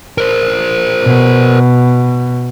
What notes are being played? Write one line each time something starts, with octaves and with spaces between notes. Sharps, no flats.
A#4 C5
B2